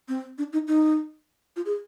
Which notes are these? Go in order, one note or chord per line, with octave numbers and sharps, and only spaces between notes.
C4
D4
D#4
D#4
F4
G#4